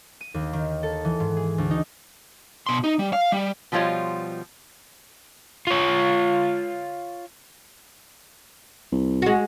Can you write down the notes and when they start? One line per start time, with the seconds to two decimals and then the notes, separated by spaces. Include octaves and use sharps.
0.21 D#7
0.34 D#2
0.53 D#3
0.83 A4
1.05 E3
1.20 G#2
1.37 G#4
1.58 D2
1.71 D#4
2.67 B2 C6
2.84 D#4
2.99 G3
3.13 F5
3.32 G3
3.72 B2 F3 G3 F4 C#5 D#5
5.67 F4 C#5
8.92 C2
9.22 G#3 F#4